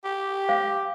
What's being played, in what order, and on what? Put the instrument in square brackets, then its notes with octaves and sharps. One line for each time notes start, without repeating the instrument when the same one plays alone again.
[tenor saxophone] G4
[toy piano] C5 F5